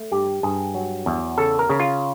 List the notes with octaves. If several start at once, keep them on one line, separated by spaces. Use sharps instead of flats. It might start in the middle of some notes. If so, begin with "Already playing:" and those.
Already playing: A3
G2 G4
G2 G#4
F#3
E2
C#3 A4
A#4
C#3
F4